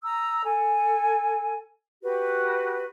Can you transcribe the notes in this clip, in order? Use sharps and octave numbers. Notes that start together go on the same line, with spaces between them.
A#5 D#6 E6
A4 G#5
F#4 G4 B4